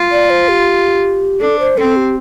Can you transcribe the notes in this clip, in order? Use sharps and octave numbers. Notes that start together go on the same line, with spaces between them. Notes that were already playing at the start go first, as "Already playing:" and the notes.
Already playing: F4
D5
C5
G4
D4 A4
C5
C4 A4
G4